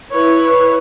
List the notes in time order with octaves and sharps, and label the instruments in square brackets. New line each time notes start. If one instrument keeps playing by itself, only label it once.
[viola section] E4 B4 C#5